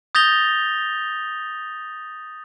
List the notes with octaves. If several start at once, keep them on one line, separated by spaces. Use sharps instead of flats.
D#6 G6 A6 A#6 F7 G7